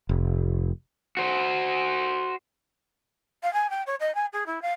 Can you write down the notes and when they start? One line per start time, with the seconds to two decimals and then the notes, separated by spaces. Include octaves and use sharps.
0.09 F1
1.17 F#4 C5
3.42 F5
3.53 G#5
3.70 G5
3.86 C#5
4.00 D#5
4.15 G#5
4.33 G#4
4.46 E4
4.62 F5